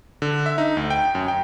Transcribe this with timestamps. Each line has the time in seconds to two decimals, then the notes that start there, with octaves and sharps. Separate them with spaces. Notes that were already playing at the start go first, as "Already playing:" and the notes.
0.22 D3
0.46 E5
0.58 D#4
0.77 D2
0.90 G5
1.15 F#2
1.28 G5